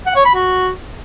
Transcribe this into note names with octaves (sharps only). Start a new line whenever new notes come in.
F#5
C#5
B5
F#4